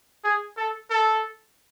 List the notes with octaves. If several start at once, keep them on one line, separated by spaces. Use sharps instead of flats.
G#4
A4
A4